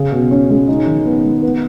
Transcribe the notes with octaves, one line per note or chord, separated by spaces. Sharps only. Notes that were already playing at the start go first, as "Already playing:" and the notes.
Already playing: C#3 G#4
B2
C#4
G#3
D#4
D#3
B3
G#3
B3